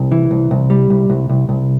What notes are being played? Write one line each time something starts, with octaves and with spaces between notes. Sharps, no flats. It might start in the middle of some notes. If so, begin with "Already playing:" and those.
Already playing: C2
E3
C2
C2
G3
C2
C2
C2
C2